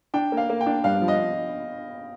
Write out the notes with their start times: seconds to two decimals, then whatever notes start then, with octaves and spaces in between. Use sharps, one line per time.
0.14 D4 G5
0.32 A#3
0.37 F5
0.50 A#3
0.61 G5
0.66 D4
0.84 G2 F5
1.02 F3
1.08 D#5